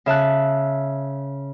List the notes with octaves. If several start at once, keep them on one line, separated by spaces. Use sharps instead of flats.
C#3 E5 A5 F#6